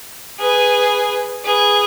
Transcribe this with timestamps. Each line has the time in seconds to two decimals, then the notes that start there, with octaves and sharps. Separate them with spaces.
0.39 G#4 B4
1.45 G#4 B4